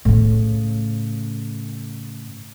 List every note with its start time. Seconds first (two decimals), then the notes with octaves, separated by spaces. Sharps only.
0.05 A2 C#3